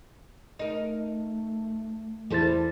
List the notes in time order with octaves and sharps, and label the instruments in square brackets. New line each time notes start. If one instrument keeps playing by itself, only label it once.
[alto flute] A3 [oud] D#4 A#4
[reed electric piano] E2 E4 A6 [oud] G3 A4 C5